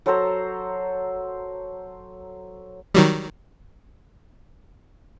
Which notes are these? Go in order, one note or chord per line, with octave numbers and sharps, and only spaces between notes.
F#3 A4 C5 A#5
D#3 F#3 G3